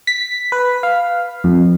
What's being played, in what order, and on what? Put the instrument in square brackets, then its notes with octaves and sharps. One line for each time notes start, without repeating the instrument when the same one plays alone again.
[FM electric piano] B6
B4
F5
F2